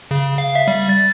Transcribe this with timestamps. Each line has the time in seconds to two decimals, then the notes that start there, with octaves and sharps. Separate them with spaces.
0.11 C#3
0.38 F5
0.55 E5
0.68 G3
0.89 A6